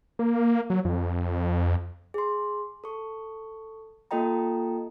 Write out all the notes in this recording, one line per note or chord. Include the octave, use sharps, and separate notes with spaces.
A#3
F#3
F2
G#4 C6
A4 C#6
A#3 F4 A4 D#5 G5 A#5